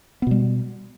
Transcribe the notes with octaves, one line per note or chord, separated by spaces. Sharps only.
B2 G3 B3